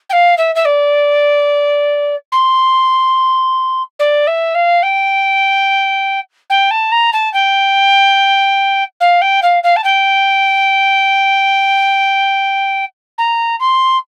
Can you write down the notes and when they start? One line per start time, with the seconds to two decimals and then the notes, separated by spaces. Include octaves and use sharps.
0.09 G5
0.13 F5
0.37 E5
0.55 E5
0.65 D5
2.32 C6
3.99 D5
4.27 E5
4.55 F5
4.83 G5
6.50 G5
6.71 A5
6.92 A#5
7.13 A5
7.33 G5
9.00 F5
9.21 G5
9.42 F5
9.63 F5
9.76 A5
9.84 G5
13.18 A#5
13.60 C6